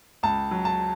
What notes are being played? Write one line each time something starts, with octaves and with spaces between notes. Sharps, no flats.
C#2 A5
F#3
A5